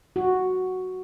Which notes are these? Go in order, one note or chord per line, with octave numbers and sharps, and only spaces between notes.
F#4